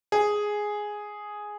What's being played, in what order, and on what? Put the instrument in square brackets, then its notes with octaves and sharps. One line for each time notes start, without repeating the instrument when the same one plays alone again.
[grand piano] G#4